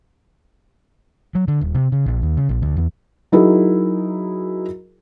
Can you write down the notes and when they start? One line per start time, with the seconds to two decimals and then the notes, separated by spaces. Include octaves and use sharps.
1.35 F#3
1.48 D3
1.61 D#1
1.74 C3
1.92 C#3
2.06 A#1
2.22 D#2
2.37 C#3
2.49 A#1
2.62 D2
2.77 E2
3.32 F#3 D#4 E4 F#4 G#4 A#4